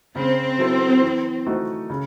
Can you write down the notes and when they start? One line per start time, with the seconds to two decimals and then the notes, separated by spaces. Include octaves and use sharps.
0.16 C#3 C4
0.58 F#3 B3 E4 A4
1.02 E3
1.46 A3 C4 D#4 F#4
1.90 C#3